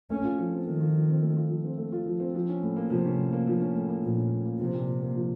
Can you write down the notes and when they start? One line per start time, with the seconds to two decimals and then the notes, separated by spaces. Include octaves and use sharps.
0.10 A3 C#4
0.24 F4
0.38 F3
0.53 C4
0.65 D#3 A3
0.81 F4
0.94 F3
1.08 C4
1.22 A3
1.37 F4
1.50 F3
1.65 C4
1.78 A3
1.92 F4
2.06 F3
2.20 C4
2.35 F3
2.49 C#4
2.63 A2
2.76 A#3
2.90 C3 F3
3.05 C#4
3.19 A2
3.33 A#3
3.47 F3
3.60 C#4
3.76 A2
3.88 A#3
4.03 A#2 F3
4.17 C#4
4.32 A2
4.45 A#3
4.60 C3 F3
4.74 A#2
4.88 A#2
5.02 A#3
5.16 F3